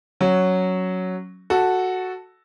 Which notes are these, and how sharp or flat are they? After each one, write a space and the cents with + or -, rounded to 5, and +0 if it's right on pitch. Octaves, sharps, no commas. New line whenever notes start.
F#3 +0 C#4 +0 F#4 +0
F#4 +0 A4 +0